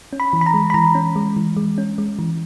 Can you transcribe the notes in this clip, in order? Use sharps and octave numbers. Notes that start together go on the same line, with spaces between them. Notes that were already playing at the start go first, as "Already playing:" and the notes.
C#4
B5
E3
B5
A#5
G#3
B5
E3 A#5
C#4
G#3
E3
G#3
C#4
G#3
E3